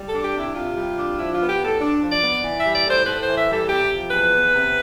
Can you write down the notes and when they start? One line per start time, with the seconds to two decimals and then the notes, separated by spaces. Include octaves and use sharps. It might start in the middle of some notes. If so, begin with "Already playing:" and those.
Already playing: G3
0.09 D4 A4
0.25 G4
0.35 C3 E4
0.55 C3 F4
0.77 G3
0.97 D4
1.19 F3 E4
1.35 F4
1.40 B3
1.49 G4
1.60 A2 A4
1.81 D4
2.02 F3
2.12 D5
2.23 B3
2.44 E3
2.60 G3 E5
2.75 D5
2.85 A2
2.91 C5
3.06 A2 B4
3.23 C5
3.28 E3
3.38 E5
3.49 G3 A4
3.69 C3 G4
3.90 F3
4.11 E2 B4
4.33 B3
4.54 C3